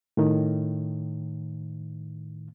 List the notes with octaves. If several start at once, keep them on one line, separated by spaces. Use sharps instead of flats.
A2 D#3